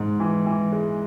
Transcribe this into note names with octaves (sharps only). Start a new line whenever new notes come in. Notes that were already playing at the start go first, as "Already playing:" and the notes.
Already playing: G#2
E3
E3
G#3